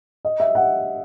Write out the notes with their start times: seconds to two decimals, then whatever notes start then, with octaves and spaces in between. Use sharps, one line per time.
0.25 D#5
0.40 E5
0.55 F#5